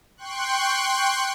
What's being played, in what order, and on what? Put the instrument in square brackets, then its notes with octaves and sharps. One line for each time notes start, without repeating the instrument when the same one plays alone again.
[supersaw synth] G5 C6 C#6 F#6